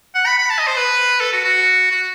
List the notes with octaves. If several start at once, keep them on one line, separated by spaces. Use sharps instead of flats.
F#5
B5
B5
A5
D#5
C5
B4
A4
F#4
F#4
F#4